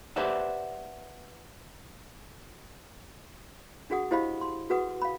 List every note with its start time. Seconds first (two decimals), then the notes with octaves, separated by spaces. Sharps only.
0.16 G4 B4 C5 D5 E5 F#5
3.90 D4 F#4 G#4 F#5 D#6
4.11 E4 G4 C5 D#5 F5 B5
4.41 C6
4.70 F#4 G#4 B4 F#5 D#6
5.02 F5 B5